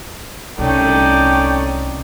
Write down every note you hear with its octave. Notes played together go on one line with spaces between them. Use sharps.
C2 A3 C#4 D#4 D5 G5